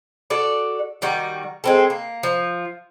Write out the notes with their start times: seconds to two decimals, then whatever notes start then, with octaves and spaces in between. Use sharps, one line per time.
0.30 F#4 A4 D5
1.02 D#3 G3 F#4
1.64 G#3 C4 A4
1.90 A#3
2.23 F3